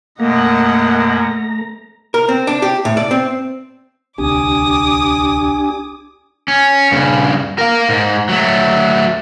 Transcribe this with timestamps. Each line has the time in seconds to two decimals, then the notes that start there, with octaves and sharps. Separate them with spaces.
0.20 F#2 B2 A3 A#3 D#5 F#5 A#5
2.14 A#4
2.29 C4
2.47 D4
2.62 G4
2.85 A2
2.97 D5
3.11 C4
4.18 D1 C2 C4 D4 G4 G#5 D6 D#6
6.48 C#4
6.92 G2 C#3
7.58 A#4 F5
7.89 G#2
8.29 F#3 A3